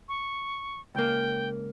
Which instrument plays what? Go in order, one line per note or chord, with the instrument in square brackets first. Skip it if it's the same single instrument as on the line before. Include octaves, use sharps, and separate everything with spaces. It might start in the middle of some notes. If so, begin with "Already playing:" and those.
[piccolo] C#6
[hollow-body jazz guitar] C#2 A#3 [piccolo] G5